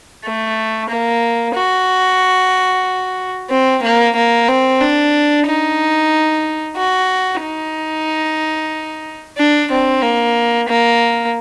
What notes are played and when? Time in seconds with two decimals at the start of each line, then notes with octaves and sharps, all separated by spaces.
0.24 A3
0.89 A#3
1.55 F#4
3.50 C4
3.82 A#3
4.16 A#3
4.48 C4
4.81 D4
5.46 D#4
6.76 F#4
7.42 D#4
9.37 D4
9.70 C4
10.02 A#3
10.68 A#3